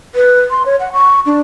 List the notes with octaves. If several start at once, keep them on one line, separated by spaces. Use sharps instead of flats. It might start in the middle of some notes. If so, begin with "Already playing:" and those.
B4
C6
C#5
F#5
C#6
D4